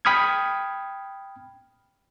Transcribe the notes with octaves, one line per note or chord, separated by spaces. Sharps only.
G5 B5 D#6 F6 G#6